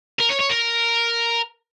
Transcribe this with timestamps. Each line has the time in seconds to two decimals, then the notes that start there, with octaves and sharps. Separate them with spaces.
0.20 A#4
0.30 C#5
0.41 C#5
0.50 A#4